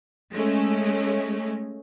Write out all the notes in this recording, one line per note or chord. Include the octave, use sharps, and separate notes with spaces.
G#3 A3 C#4